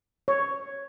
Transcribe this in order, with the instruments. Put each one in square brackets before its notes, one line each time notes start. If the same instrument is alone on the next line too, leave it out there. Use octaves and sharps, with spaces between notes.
[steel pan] C#5